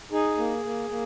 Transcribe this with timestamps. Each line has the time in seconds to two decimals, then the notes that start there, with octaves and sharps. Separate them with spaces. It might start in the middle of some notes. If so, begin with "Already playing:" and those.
0.12 D#4 G#4
0.38 A#3
0.64 A#3
0.90 A#3